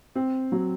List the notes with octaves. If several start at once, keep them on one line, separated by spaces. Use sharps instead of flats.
C4
F#3